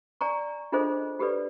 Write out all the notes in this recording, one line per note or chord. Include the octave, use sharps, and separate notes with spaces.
D5 G#5 A#5 C#6
D4 F4 G#4 A4 C5 D#5
F#4 G4 A4 B4 D5